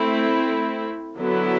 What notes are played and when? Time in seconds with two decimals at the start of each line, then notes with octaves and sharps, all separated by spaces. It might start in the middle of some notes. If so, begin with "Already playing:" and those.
Already playing: A3 C4 E4
1.18 D3 F#3 B3 E4